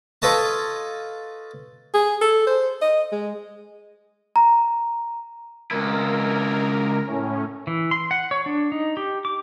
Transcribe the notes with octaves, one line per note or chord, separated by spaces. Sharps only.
F4 A4 B4 C#5 D#5 A5
G#4
A4
C5
D#5
G#3
A#5
C#2 E4 A#4
A2 C#4
E3
C6
F#5
C#5
D4
D#4
G4
D6